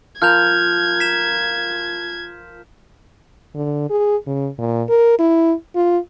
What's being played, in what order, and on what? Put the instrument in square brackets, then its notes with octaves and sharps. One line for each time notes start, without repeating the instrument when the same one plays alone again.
[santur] F3 F4 A#4 [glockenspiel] F6 G6 F7 [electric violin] G#6
[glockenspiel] B6 E7
[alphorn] D3
G#4
C#3
A#2
A#4
E4
F4